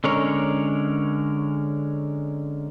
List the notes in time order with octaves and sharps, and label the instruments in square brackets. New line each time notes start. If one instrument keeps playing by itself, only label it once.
[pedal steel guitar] D3 G#3 C#4 A#4 C#5